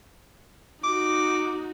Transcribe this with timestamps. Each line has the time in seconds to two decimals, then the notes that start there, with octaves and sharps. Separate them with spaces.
0.84 D#4 F#4 D6